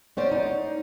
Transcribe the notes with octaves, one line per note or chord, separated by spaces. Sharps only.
B3 C#4 C5 D5
D#4